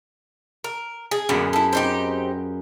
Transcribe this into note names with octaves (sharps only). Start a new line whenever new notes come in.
A#4
G#4
F#2 A#2 D3 B3 G#4
E4 A4
C4 D#4 G4